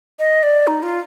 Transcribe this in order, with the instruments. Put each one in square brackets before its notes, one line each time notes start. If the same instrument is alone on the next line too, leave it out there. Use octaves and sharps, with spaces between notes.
[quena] D#5
D5
D#4
F4